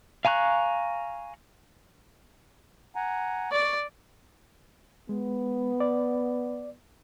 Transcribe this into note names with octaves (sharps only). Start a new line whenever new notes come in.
F5 G#5 A#5 C#6 F#6
F#5 G#5 A#5
D5 C#6
G#3 B3
D5